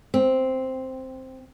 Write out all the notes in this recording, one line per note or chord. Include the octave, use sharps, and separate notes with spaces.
C4